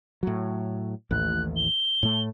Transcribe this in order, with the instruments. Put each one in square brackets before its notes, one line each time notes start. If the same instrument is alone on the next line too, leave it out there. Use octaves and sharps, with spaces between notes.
[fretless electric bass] A2 F#3
[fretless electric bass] A1 D#2 A2 [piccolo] F#6
[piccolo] G7
[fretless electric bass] A2 A3